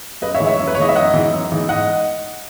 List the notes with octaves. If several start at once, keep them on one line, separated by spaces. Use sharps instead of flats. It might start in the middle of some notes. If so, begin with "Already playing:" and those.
F#2 B4 D#5
C#5 E5
E3 G#3 D#4
C#5 E5
F#2
B4
C#5
E3 G#3 D#4 D#5
E5
F#2 D#5 F#5
E3 G#3 D#4
F#2
E3 G#3 D#4
G#2 D#5 F#5